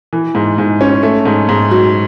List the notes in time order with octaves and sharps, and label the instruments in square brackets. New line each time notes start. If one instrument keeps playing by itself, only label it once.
[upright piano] E3
G#2
G#2
C#4
A3
G#2
G#2
F#3